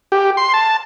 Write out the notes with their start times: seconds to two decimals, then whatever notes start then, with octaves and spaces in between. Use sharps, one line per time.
0.12 G4
0.37 C6
0.54 A5